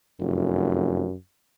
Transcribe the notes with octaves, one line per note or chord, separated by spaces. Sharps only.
F1 F#2